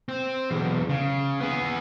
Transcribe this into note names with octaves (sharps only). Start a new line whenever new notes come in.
C4
B1 E2
C#3
B3 G#4